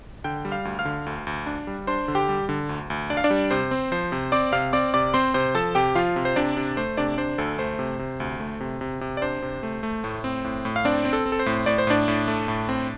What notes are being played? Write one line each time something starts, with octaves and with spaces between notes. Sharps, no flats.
D3 G5 G6
G3
F5 F6
D2
F5 F6
D3
D2
D2
D4
G3
D4 C5 C6
D3
G4 G5
G3
D3
D2
D2
D4 D5
F5
D4 D5
G3
C3 C5
C4
F3 C5
C3
C4 D5 D6
C3 F5 F6
C4 D5 D6
C3 D5 D6
C4 C5 C6
C3 C5 C6
F3 A4 A5
C3 G4 G5
F3 F4 F5
C3
C5
C3 D4 D5
C3
A3 C5
C3 D4 D5
D4 C5
D2 A4
A3 C5
C3
C3
D2
A3
C3
C3
C3
D5
D4 C5
C3
A3
A3
A2
C4
A2
A2
F5
C4 D4 D5
C4
A4
C4
A4
C5
A2
A2 D5
C5
A2 D4 D5
A2
A3
A2
C4